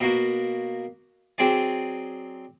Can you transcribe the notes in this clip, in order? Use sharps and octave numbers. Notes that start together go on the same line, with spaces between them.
B2 A#3 F#4
F#3 C4 G#4 D5